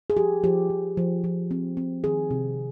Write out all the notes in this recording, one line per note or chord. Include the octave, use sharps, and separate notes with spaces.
G#4
F3 G4
F3 G4
F3
F3
F3
C4
C4
D#3 G#4
C3